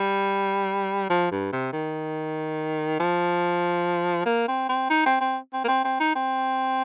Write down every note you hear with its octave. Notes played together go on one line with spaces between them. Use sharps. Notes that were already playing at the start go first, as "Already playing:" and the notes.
Already playing: G3
F3
G2
C3
D#3
F3
A#3
C4
C4
D#4
C4
C4
C4
A#3
C4
C4
D#4
C4